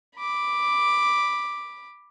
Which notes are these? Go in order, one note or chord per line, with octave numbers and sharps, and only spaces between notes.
B5 D6